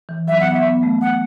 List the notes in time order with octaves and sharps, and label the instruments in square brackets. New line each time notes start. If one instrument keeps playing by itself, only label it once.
[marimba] E3
[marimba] F#3 [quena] E5
[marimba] B3 [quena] F#5
[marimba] B3 [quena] E5
[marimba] B3
A3
[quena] F#5